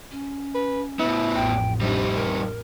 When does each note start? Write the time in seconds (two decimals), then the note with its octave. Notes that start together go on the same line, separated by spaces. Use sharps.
0.11 C#4
0.55 B4
0.99 A2 B3 E4
1.35 A1 F2 G5
1.81 C3 G3 D4 D#4
2.15 A#4